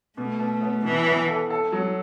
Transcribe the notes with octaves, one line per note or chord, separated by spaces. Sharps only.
B2 A3
B2
B3
B2 E3
B3
A4
A4
F#3